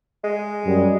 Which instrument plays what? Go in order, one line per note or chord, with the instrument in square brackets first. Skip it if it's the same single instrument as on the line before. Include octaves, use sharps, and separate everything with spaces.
[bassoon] G#3
[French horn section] F#2 G3